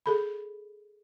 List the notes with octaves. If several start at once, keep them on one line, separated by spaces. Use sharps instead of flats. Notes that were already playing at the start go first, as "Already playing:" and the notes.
G#4 A4 B5